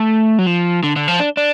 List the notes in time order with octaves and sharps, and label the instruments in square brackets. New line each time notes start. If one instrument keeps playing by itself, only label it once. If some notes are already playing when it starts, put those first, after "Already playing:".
Already playing: [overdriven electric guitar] A3
F#3
F3
D3
D3
F3
D4
D4